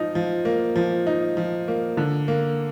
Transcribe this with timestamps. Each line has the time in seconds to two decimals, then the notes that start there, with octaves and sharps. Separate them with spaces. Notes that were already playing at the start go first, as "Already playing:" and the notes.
Already playing: F3 D#4
0.15 F3
0.45 A#3
0.76 F3
1.07 D#4
1.37 F3
1.68 A#3
1.97 D3
2.28 A#3